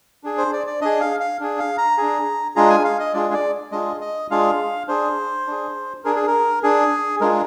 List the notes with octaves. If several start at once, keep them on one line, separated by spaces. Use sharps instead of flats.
D4 G#4
C5
D5
D5
D4 G#4 D#5
F5
F5
D4 G#4
F5
A#5
D4 G#4
G#3 D4 F4 G#4 A#5
G#5
F5
D#5
G#3 D4 F4 G#4 D5
D5
G#3 D4 F4 G#4 D#5
D#5
G#3 D4 F4 G#4 F5
D4 G#4 C5
D4 G#4
D4 G#4 A#4
G#4
A#4
D4 G#4
G#3 D4 F4 G#4 A#4